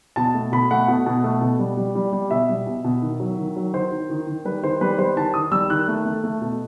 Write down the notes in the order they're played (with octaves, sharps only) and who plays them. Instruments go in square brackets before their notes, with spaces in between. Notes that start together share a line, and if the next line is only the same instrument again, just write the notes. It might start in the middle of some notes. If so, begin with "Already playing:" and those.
[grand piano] B2 A5
A3
B2 B5
A3 F#5
B2 F#5
B2
A3
B2
G3
G3
G3
G3
B2 E5
G3
B2
B2
D#3
F#3
D#3
F#3
D#3 C5
D#3
D#3
D#3
G3 B4
D#3 C5
G3 B4
G3 C5
D#3 A5
D#3 D#6
G3 E6
D#3 F#6
A3
A3
A3
B2